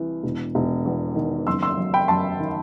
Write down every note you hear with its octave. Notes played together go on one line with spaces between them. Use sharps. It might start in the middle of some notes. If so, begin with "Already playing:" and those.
Already playing: C2 E3
E1
E1
E2
D#3
F#1 C6 E6
C6 E6
F#3
G5 B5
F#2 A5 C6
D#3